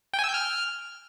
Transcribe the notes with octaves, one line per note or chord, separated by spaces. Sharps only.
G5
G#5
E6
G6
F6